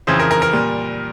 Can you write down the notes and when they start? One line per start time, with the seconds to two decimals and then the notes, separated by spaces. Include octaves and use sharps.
0.07 F2 C#3 E3 C5
0.20 A#4
0.31 A#4
0.42 A#4
0.53 A#2 G3